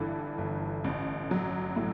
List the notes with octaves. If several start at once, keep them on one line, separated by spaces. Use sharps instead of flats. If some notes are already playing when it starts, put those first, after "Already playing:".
Already playing: G1 G2 E3 A4
G1
A1
F#3
A2